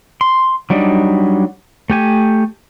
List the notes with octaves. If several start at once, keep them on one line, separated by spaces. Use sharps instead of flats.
C6
F#3 G3 D4 D#4
A3 G4 G#5